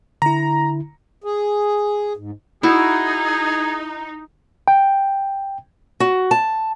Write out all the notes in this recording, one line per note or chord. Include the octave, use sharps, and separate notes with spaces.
D3 E4 A#5
G#4
G#2
D#4 E4 F#4 G#4
G5
F#4
A5